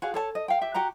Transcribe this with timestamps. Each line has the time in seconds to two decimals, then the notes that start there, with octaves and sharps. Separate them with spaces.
0.02 F#4 G#4 F5
0.14 A4 C#5 A5
0.35 D#5
0.48 F5 G5
0.61 G4 E5
0.74 F#4 G4 F#5 A#5